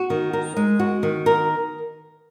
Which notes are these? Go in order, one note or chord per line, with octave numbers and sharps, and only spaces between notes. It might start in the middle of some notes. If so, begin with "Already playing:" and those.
Already playing: F#4
D#3
A#4
G#3
F#4
D#3
A#4